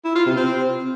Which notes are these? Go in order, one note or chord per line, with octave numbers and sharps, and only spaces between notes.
E4
F4
C3
C4